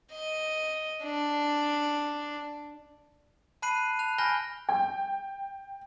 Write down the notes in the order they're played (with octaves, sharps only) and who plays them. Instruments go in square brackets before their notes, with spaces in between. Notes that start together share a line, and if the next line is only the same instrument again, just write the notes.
[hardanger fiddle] D#5
D4
[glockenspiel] A5 B5 F#6 C7 D#7 F#7
A5 F#6 F7
G#5 B5 F6 G6 A#6 G7
[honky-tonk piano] G5